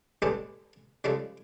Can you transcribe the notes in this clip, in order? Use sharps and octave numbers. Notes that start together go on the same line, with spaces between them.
G#3 B3 C#4 D4 G4 A4
C#3 F3 G3 G#3 A4